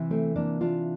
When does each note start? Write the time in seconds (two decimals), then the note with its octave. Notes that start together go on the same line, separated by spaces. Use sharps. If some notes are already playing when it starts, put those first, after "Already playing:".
Already playing: C3 E3
0.10 A3 C4
0.36 A#3 D4
0.61 D4 F4